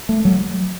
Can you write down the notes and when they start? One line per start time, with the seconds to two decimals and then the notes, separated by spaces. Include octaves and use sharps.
0.09 A3
0.25 F#3